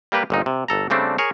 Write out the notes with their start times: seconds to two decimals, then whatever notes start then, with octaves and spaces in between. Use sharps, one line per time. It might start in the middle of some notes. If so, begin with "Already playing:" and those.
0.12 G3 A#3 G4 B4
0.30 G1 A#2 D#4
0.46 C3
0.68 G1 A4 A#5
0.90 C#3 G3 A3 C4 D4
1.18 G#4 A#4 C#5